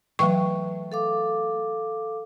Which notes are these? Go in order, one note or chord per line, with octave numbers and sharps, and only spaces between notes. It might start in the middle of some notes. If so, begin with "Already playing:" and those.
E3 F#3 A3 B4 G5 C#6
A4 F5 D6